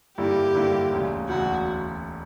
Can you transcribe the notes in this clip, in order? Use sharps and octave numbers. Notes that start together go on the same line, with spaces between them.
G2 D3 A#3 E4 G4
G2 D3 A#3 E4
E1 D2 C#3
E1 D2 C#3 F#4